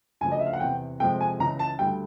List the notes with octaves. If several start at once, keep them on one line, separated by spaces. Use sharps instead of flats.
D2 C#3 F3 G#5
D#5
E5
F5
F#5
E2 C3 E3 G5
F2 C3 F3 G#3 C4 G5
G#5
C#2 C#3 E3 A#5
A5
D2 D3 G3 G5